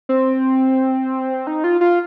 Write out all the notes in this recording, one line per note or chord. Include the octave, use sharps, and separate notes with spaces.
C4
D#4
F4
F4